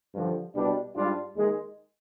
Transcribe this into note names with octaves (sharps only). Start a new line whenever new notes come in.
G2 D3 F3
C2 B2 G3 D4
G#2 G3 D4 F4
D#2 D#3 G#3